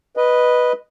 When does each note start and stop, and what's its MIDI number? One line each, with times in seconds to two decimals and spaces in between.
0.17 0.73 71
0.17 0.73 75